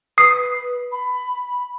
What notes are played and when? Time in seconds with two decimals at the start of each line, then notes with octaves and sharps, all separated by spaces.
0.18 B4 D#6 C7
0.92 B5